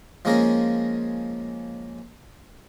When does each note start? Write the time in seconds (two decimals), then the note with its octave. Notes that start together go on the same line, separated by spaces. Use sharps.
0.25 F3 G#3 A#3 C#4 G#4 A#4